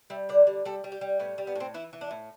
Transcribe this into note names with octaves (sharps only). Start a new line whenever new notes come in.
G3 E5
D3 D5
G3
G3 A4
G3
G4
G3
A2 B3
G3
B3
A2 C4
E3 E4
E3
D4
A2